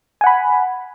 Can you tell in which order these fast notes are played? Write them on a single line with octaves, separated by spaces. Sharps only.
G#5 F#5 B5